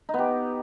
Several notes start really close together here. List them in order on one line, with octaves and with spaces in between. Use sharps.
D#4 B3 G4